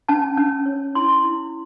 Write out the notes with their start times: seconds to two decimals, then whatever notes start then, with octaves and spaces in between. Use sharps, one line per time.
0.09 C#4 A5
0.37 C#4
0.66 C#5
0.95 E4 C6
1.24 E4